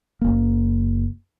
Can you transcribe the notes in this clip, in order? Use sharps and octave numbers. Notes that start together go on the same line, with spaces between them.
F#1 A#3